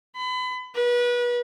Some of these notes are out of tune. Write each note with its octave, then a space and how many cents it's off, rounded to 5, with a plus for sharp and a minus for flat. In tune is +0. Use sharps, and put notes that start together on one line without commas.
B5 +35
B4 -30